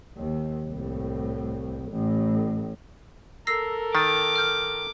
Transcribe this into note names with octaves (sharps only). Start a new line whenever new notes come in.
D#2
C2 A2
A1 A2
A4 A#4 E6 A#6 C7
D#3 D6 A6
F6 G6